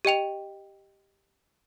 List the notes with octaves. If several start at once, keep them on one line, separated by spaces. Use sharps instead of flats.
G4 D#5 G5 F7